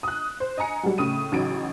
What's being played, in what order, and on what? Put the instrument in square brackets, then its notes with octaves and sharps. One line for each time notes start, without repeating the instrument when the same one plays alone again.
[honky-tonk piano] D#6 F#6
C5
D#5 G#5 A#5 C#7
F#3 G3
A2 C#3 D#6 D#7
A1 C#3 F#3 D#4 D7